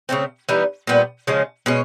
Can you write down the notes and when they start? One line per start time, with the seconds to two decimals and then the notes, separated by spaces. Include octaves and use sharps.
0.09 C#3 F#3 A3 C4
0.49 E3 G3 B3 D#4
0.87 A#2 G3 B3
1.27 C#3 F3 G#3 C#4
1.66 B2 G#3 C#4